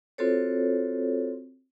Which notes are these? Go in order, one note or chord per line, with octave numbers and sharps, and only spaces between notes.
C4 F4 F#4 A4 C5 C#5